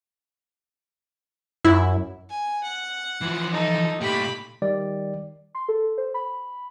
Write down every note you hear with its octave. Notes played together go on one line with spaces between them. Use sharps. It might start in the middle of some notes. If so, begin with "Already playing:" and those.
F#2 E4
G#5
F#5
E3 F3
D#4 A4
A#2 A3 G4 B5
D#3 G3 D5
C6
A4
C5
B5